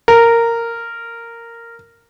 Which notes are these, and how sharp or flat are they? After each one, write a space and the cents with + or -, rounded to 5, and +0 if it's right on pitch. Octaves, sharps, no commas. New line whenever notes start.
A#4 -10